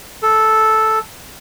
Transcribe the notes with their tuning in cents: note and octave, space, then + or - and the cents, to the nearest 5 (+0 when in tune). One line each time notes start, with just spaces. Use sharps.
A4 -5